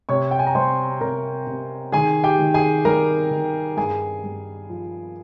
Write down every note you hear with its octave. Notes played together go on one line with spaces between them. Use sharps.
C3 C#5 C#6
G5
G#5
A#5
G3 C5 C6
C3 A#4 A#5
C3
D#3 G#4 G#5
G4 G5
D#3
G#4 G#5
G3 A#4 A#5
D#3
G2 G#4 G#5
G2
F3